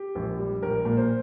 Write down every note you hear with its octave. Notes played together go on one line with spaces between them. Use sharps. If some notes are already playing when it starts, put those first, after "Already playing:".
Already playing: G4
A#1
G3
A#1 A#4
A#2
C5